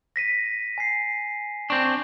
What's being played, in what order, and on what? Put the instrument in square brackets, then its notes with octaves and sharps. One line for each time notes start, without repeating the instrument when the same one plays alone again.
[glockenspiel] A#6 B6 D#7
G#5 C7
[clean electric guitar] C4 D4 [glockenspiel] C#6